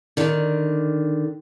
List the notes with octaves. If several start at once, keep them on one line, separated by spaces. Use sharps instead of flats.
D3 D#3